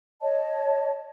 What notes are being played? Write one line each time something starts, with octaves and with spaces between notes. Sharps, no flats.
C#5 D#5 A5